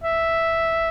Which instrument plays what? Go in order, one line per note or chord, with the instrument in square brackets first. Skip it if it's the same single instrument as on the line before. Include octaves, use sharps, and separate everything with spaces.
[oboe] E5